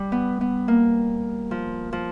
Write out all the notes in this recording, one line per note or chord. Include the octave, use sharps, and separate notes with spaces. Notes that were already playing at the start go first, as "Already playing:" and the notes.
Already playing: G3
B3
B3
A#3
F3
F3